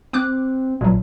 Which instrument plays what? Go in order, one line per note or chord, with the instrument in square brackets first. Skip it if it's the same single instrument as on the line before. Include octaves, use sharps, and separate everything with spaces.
[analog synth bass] C4 [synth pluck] G5 D6 F#6
[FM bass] A1 [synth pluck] A#2 F#3